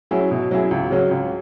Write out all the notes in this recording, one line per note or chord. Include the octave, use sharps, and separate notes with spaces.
F#3 C#4 E4 G#4
B2
F#3 C#4 E4 G#4
C#2
C#3 F#3 C#4
C#2